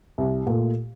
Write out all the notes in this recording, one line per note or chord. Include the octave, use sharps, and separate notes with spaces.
C2
A#2 A3